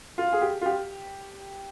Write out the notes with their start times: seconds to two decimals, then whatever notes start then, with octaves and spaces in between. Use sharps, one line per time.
0.18 F4
0.33 G#4
0.41 G4
0.61 F4
0.66 G4